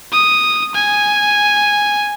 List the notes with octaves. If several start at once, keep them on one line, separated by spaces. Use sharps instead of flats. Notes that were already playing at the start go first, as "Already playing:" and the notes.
D#6
G#5